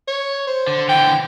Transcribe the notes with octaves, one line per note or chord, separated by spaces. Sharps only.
C#5
C5
D3
D3 E3 G5